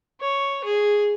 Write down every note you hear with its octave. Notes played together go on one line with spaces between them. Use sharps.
C#5
G#4